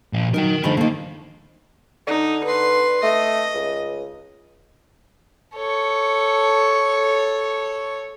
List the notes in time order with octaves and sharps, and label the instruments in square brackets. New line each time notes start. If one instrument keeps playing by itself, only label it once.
[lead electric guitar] A#2 F3
[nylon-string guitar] F#3 D#4 [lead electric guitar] A#4 G5
[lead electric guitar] D3 B5 [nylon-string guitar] D#3 F3 A3
[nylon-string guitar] D3 D#3 [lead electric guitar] A#3
[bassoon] D3 [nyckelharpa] D#4
[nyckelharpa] B4 C6
[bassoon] A3 [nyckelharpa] D#5
[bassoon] C#2
[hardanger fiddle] A4 C#5